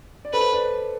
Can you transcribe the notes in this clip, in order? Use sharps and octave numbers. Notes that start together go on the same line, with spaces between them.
D5
A4 B4 C5
B4 D5